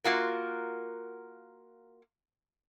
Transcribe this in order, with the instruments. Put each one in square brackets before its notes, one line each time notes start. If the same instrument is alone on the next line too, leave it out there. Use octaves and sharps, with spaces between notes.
[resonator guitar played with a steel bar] A#3 F4 F#4 A#4